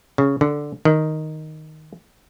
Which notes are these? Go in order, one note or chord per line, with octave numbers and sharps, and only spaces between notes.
C#3
D3
D#3